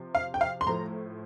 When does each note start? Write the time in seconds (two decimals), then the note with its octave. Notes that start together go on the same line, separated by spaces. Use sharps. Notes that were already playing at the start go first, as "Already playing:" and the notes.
Already playing: C3 F3
0.15 F5
0.34 G5
0.41 F5
0.61 C6
0.66 A2 F3 A3 A#5